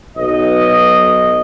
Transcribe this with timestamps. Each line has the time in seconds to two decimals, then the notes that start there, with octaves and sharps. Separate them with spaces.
0.17 B1 D#5